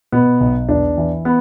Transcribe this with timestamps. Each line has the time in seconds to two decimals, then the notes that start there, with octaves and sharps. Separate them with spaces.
0.12 B2 B3
0.40 B1
0.68 E2 D4
0.97 E3
1.25 B3